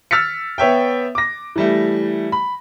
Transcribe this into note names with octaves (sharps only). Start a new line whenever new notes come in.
E6 F6 A6 B6 C#7
B3 C#5 E5 G5
D6 A#6
E3 G3 A3
B5